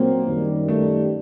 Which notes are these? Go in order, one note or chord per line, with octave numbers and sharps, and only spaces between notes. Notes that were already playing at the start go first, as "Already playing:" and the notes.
Already playing: A#2 F#3 A#3 C4
F#2 D#3 G3
A3